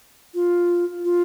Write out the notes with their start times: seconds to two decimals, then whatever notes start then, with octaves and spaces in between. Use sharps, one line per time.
0.34 F4
1.05 F4